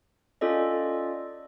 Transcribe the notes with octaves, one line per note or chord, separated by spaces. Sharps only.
C#4 F4 A4 D5 D#5